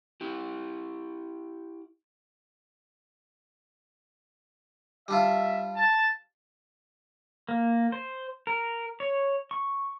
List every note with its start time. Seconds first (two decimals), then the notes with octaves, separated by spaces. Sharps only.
0.21 E4 G4
5.08 G3 D4 F4 E5
5.76 A5
7.49 A#3
7.92 C5
8.47 A#4
9.00 C#5
9.51 C#6